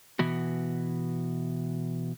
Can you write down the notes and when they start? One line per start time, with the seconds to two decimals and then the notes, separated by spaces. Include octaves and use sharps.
0.19 B2 E3 B3 F#4